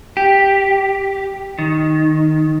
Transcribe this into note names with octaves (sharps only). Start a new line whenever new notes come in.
G4
D#3